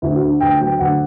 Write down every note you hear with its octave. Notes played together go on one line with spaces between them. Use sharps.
D2 E4
F#4
D3
D2 G5
F#3 G5
D2 F#5